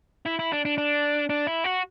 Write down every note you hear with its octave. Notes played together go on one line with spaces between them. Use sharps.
E4
E4
D4
D4
D4
D4
E4
F#4